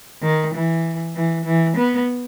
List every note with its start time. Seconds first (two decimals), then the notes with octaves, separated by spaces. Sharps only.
0.22 D#3
0.54 E3
1.15 E3
1.45 E3
1.77 B3